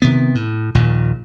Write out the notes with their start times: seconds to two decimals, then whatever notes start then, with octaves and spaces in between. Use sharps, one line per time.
0.02 C3 D#3 B3
0.35 A2
0.75 A#1 D#2 A#2